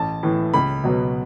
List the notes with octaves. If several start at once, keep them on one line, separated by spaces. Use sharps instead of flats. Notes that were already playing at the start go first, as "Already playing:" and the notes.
Already playing: A1 A5
A2 E3
C#2 B5
B2 F#3 B3